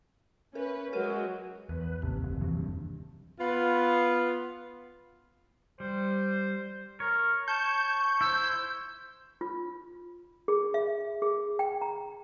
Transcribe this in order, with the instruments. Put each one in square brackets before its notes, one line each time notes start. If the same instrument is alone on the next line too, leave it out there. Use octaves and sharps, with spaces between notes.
[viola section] C#4 B4 [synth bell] A#4
[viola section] F#3 G#3 F#4 [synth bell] A#4 F6 D#7
[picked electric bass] E2 [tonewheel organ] B4
[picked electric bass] A1 [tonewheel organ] D#2 C3
[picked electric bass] F#1
E1 E3 F#3
F#1 G2
[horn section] B3 F4
[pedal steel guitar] G3 [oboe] C5
[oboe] A#4 [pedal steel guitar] C#5
[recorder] A5 [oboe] C#6 [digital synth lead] G6
[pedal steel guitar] E4 C5 [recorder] E6
[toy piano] F4
G#4
E5
G#4
G5
A#5